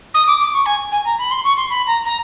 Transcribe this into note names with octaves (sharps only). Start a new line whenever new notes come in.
D#6
D6
D6
C#6
G#5
G#5
A#5
B5
C6
C#6
C6
B5
A#5
A#5